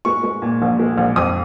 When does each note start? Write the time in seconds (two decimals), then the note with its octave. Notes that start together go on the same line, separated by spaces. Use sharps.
0.05 G#3 C#6
0.23 G#3
0.42 A#2
0.62 A#1
0.79 G#3
0.98 A#1
1.16 F2 D#6